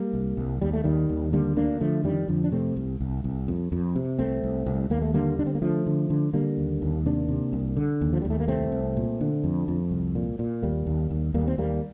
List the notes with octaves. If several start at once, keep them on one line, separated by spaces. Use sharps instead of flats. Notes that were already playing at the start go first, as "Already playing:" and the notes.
Already playing: G3 A#3
C2
C2
D#2 G3
A3
D#2 D#3 G3
D#2
D3 G3 A#3
D2 A#3 D4
D3 F3 A3
F2 D#3 G3
F2 D3 F3
D4
C3 A3 C4
C2
C2
C2
F2
F2
C3
C2 A3 C4
C2
C2
D#2 A#3
A3
D3 G3 A#3
D3 D4
C4
A#3
D3 F3 A3
D3
D3
D3 G3 A#3
D#2
D#2
C3 A#3 D4
C3
C2
D3
D#2
F3
D#2 G3
A3
A#3
C2 A3 C4
C2
A#2
D3
F2
F2
C2
A#2
A#2
D#2 G3 A#3
D#2
D#2
D#2 G3 A#3
C4
D#2 G3 A#3